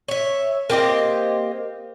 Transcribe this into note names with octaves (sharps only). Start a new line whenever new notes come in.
C#5 E5
A#3 C4 G4 D#5